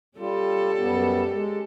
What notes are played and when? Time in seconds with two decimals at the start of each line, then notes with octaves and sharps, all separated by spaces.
0.18 G3 C#4 F4 G4 A4
0.78 F#2 G3 B3
1.31 G#3